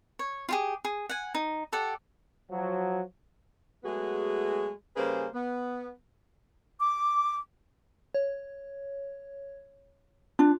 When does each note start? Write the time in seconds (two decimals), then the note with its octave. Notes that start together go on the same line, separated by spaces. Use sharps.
0.19 C#5
0.49 F4 G4 G#4
0.85 G#4
1.09 F#5 G#5
1.35 D#4
1.72 G4 A4 D5 F#5
2.50 F3 F#3
3.84 F#3 G#3 A3 B3 F#4 G#4
4.96 C#3 G3 A#3 G#4 B4 C5
5.34 B3
6.80 D6
8.15 C#5
10.39 D4 F4